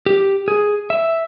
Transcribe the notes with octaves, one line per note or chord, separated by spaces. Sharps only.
G4
G#4
E5